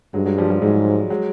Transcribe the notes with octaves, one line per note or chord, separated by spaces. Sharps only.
G2 F#3 G#3
F#3 G#3
F3 G3
F3 G3
G#2 F#3 G#3
F#3 G#3